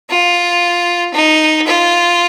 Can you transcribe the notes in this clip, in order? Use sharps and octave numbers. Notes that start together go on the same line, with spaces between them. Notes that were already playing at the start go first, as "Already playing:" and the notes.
F4
D#4
F4